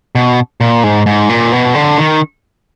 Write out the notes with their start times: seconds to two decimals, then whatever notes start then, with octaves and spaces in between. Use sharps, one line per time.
0.15 B2
0.61 A#2
0.84 G#2
1.06 G#2
1.30 A#2
1.52 B2
1.75 D3
1.98 D#3